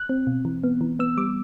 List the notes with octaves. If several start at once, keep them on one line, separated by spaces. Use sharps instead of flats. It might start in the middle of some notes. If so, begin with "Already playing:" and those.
Already playing: F#6
C4
B2
E3
B3
E3
B3 E6
G3 D6